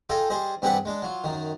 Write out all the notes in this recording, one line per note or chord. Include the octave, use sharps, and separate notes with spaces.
F4 G#4 A4 D#5 G5
G3 G#4 C5 D#5
G2 C4 G4 G#4 B4 F#5
G#3 D4
F#3 F4
F#2 D#3